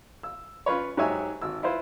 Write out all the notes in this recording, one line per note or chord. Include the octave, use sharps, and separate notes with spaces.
E6
C#4 F4 B4 C#5
G#2 F#3 G4 C#5 E5 G#5
G#1 E6
E4 F4 B4 C5